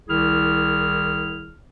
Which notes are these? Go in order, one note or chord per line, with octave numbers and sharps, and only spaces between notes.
C2 D#3 E4 G#4 F6